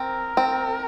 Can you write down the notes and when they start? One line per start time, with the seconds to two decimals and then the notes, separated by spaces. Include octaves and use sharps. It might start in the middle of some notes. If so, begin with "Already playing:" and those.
Already playing: C4 A#4
0.37 C4